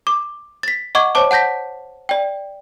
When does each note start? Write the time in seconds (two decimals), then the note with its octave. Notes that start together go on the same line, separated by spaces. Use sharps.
0.07 D6
0.63 A6 B6
0.95 D#5 F#5 C#6 D6 G#6
1.15 C5 C#5 A5 D6
1.31 F#5 A5 G6 A#6 B6
2.09 D5 G5